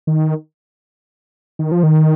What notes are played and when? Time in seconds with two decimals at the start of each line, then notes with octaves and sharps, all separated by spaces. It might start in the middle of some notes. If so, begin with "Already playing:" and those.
0.07 D#3
1.59 D#3
1.72 F3
1.83 D#3